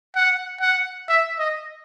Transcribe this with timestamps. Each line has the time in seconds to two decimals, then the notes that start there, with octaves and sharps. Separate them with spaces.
0.16 F#5
0.61 F#5
1.08 E5
1.39 D#5